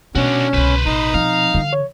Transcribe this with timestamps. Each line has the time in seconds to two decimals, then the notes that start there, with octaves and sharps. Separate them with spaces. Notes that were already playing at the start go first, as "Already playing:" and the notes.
0.15 B2 G#3 C#4 D4 F#4
0.53 C2 D3 B4 C5
0.86 A1 D#4 A#5
1.14 F3 C4 F5
1.54 D3 E3
1.73 C#5